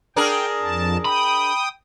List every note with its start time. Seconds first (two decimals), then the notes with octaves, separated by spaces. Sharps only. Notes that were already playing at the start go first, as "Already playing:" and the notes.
0.16 D4 G#4 A#4 G5
0.62 F2 A5
1.05 G5 B5 D#6